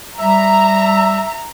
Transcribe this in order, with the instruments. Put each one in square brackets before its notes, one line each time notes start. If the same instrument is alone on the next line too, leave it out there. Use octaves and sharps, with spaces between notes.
[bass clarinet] G3 [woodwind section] E5 [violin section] A#5